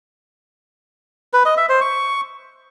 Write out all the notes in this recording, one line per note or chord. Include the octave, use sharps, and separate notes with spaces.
B4
D#5
E5
C5
C#6